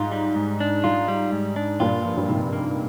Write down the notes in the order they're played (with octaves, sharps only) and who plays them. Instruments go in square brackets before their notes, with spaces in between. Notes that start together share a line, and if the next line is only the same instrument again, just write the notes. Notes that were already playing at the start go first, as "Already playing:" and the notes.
Already playing: [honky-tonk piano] G#2 [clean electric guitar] F4
[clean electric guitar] G3
G#2
D4
[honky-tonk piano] G#2 [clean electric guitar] F4
[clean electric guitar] G3
G#2
D4
[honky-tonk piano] G2 A#2 [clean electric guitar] F4
[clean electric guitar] F3
[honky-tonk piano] G2
[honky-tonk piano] G#2 [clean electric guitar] C3
[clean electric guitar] A#3